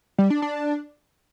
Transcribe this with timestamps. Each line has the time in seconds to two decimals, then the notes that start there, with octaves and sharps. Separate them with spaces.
0.18 G3
0.30 D4
0.42 D4